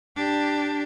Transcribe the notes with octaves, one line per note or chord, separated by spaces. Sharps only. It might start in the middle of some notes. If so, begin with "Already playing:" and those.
D4 G4